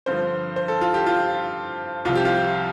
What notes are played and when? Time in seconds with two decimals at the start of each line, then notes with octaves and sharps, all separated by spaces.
0.06 G2 D3 F3 C5
0.56 C5
0.68 A4
0.81 F4
0.94 G4
1.06 F4
2.05 C2 C3 F3 F4
2.15 G4
2.25 F4